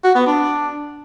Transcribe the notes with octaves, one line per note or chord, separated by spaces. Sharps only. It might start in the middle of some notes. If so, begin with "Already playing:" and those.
F#4
B3
D4